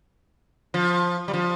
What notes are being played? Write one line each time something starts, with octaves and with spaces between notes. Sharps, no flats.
F3
G3
F3